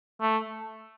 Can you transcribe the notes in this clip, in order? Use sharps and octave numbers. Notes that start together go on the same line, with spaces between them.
A3